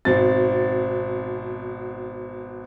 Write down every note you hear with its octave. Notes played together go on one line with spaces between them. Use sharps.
G#1 B2 C4 A6